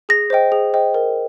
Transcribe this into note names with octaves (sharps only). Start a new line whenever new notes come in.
G#4 A#6
C5 D#5 G5
G#4
C5 D#5 G5
A#4